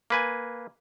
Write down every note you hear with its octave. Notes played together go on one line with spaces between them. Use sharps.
A#3 B4 G#5